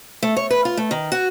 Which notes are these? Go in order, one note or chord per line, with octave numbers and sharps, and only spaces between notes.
A3
C#5
B4
F4
A3
D#3
F#4